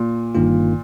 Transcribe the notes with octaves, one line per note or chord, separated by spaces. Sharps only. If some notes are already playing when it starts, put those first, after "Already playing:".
Already playing: A#2
G1 G2 D#3 A#3 F4